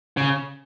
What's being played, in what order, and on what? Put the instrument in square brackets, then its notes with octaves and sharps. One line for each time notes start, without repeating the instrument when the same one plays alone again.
[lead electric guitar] C#3